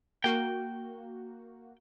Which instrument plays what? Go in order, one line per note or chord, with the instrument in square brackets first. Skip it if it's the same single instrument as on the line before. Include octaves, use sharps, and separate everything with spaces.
[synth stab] A#3 F#4 [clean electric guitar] G5